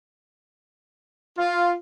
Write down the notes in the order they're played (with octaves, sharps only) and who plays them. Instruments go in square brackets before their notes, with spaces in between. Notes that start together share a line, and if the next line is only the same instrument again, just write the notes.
[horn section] F4